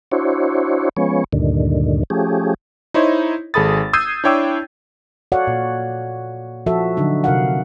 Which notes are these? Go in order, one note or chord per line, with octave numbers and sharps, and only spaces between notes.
D4 E4 F#4 C5 C#5
F3 G#3 B3 C#4 C#5
D2 G2 A#2 D3 D#3
F3 A3 C#4 G4 G#4
D#4 E4 C5 C#5 D#5
G#1 G#4 A4 B5 D#6 A6
D#6 E6 G6 G#6 C7 D#7
D4 E4 C#5 G5 D6 E6
F#4 A4 C#5 D5 F5 F#5
A#2
F3 F#4 A4 E5
D3 F3 F#3 D4 D#4
C3 A#4 F5 F#5